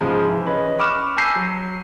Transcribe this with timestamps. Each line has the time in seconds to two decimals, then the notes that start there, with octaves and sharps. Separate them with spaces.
0.01 G#2 C#3 F3 G#3
0.28 E3
0.46 C#4 B4 D#5
0.78 B5 C#6 D6 F6 F#6 E7
1.17 G#5 A5 E6 G6 C7 D#7
1.35 F#3